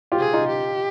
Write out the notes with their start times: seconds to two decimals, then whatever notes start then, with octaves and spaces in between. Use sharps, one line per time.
0.12 F4 G4
0.19 G#4
0.33 D#4 F4
0.48 G4